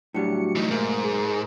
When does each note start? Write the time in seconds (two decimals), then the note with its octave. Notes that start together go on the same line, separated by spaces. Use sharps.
0.14 A2 F#3 G3 D4 F#4 G4 C#7
0.56 E3 A3 D#4
0.71 B1 G#2 A#3 A#4
1.04 G#4